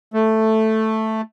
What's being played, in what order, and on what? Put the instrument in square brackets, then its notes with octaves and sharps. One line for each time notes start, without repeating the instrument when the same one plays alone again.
[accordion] A3